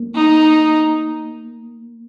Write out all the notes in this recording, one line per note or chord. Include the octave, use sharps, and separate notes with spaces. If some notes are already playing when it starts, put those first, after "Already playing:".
Already playing: A#3
D#4